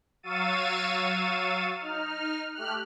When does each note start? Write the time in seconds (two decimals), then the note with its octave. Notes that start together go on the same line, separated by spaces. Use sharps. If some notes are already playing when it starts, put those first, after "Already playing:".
0.23 F#3 F5 C#6 E6 A6 D#7
1.79 D#4 F6
2.53 A3 G4 F6 F#6